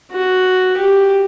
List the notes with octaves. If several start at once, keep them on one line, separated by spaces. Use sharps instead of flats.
F#4
G4